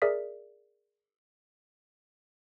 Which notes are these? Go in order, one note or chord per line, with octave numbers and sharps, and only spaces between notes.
G#4 A#4 D5 E5 D#6 B6